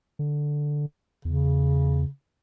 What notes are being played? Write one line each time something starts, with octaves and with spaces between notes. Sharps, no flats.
D3
E2 C#3